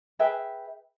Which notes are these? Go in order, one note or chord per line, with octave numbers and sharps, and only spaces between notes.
G#4 B4 E5 G5